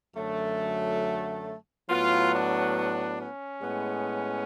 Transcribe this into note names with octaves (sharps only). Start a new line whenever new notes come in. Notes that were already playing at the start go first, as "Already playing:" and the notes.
F#2 D3 F#3 A3
A2 F#3 B3 F4
D4
D4
C#4
A2 G#3 B3